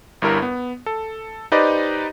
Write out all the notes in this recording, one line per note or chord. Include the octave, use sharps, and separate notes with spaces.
G1 G2 E4 A#4
B3
A4
D#4 G4 B4 C5 D5 D#5